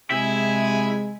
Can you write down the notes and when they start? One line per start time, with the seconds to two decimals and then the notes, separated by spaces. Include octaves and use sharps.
0.10 C3 G#3 E4 G#4 G#5